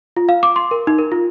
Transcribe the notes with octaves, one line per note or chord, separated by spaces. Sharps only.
F4
F5
D6
C6
A#4
D#4
A#4
F4